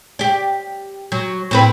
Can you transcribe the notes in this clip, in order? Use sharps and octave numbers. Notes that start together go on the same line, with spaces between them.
G4 D5
F#3
A2 C4 B4